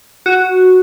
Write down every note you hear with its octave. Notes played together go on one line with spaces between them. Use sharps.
F#4